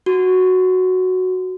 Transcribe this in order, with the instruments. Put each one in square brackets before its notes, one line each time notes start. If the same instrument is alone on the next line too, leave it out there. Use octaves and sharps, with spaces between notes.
[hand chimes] F#4